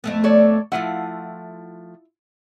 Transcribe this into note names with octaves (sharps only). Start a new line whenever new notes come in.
F2 A3 B3
A4 C#5 D5
F3 A3 E4 F4 F#5